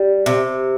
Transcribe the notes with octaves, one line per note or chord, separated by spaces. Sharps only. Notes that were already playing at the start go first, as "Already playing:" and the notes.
Already playing: G3
C3